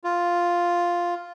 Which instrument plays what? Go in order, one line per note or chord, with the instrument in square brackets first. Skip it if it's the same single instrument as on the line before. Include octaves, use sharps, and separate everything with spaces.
[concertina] F4